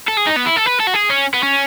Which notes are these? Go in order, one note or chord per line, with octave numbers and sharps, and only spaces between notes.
A4
G#4
D#4
B3
E4
A4
B4
A4
F#4
G#4
C#4
B3
C#4